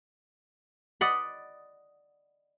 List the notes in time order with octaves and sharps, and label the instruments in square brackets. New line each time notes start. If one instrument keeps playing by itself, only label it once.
[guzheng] D5 D#5 F#5 B5